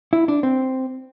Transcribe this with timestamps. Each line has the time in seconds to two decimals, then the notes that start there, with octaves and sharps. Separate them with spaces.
0.13 E4
0.28 D4
0.43 C4